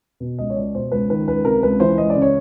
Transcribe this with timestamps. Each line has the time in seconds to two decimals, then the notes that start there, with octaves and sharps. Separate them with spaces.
0.20 B2
0.39 C#2 D#5
0.50 C#5
0.56 C#2 D5
0.75 B2 C5
0.92 C#2 B4
1.10 D#3 B4
1.28 C#2 B4
1.45 C3 A#4
1.63 C#2 B4
1.80 E3 C5
1.98 C#2 D#5
2.10 D5
2.16 C#3
2.22 C#5